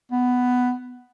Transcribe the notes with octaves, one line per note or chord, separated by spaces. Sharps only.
B3